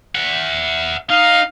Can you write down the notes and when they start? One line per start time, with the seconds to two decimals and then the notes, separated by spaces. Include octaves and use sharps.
0.15 E5 F#5
1.10 D#4 F5